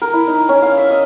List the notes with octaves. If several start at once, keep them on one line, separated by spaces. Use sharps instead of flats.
A#4
E4
D#4
C#4
F5
E5
D#5